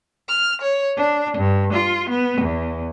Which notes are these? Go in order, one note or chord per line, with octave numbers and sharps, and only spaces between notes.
F6
C#5
D4
G2
F4
B3
E2